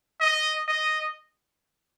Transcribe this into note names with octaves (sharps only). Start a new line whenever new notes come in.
D#5
D#5